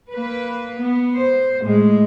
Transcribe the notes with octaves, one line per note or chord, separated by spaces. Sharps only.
A#3 B4
B3
C5
A2 G#3